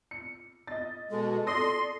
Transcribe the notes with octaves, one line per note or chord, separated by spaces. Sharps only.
C#7
D#5 A6
B2 G#3 A4
D5 C6 D#6 A#6